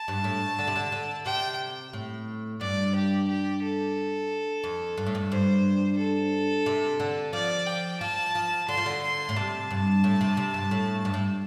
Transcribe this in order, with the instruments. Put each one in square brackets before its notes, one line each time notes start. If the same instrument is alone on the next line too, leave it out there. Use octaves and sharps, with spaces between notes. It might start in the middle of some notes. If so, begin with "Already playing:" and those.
Already playing: [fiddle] A5
[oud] G2
A2
D3
C3
D3
D3
[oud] C3 [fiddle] G5
[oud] A2
[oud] G2 [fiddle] D5
[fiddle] G4
G4
A4
[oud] F2
G2
A2
G2
[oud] G2 [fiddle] C5
[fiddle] A4
[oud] C3
D3
[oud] F3 [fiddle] D5
[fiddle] G5
[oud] F3 [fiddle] A5
[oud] F3
[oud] D3 [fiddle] C6
[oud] F3
D3
[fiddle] C6
[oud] A2
[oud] C3 [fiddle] A5
[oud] G2
A2
C3
C3
G2
A2
G2
A2